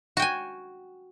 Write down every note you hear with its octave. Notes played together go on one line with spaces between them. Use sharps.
F#4 G5 G#5